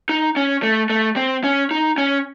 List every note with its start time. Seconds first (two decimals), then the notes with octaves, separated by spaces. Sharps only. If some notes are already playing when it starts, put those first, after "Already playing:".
0.09 D#4
0.36 C#4
0.63 A3
0.90 A3
1.16 C4
1.44 C#4
1.71 D#4
1.98 C#4